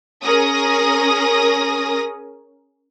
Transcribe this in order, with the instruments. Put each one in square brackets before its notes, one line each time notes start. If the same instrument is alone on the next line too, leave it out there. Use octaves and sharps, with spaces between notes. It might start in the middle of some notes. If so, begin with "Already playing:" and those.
[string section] C#4 G#4 A#4 D#6 A#6